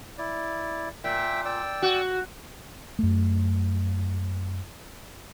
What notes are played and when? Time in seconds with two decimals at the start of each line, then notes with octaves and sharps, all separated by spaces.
0.18 E4 D5
1.04 A#2 E5 G5
1.45 D5 G5 E6
1.82 F#4
2.99 F#2 A3